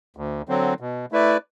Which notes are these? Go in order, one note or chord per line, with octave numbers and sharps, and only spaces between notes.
D2
D3 F#3 C4
B2
A3 E4 B4 D5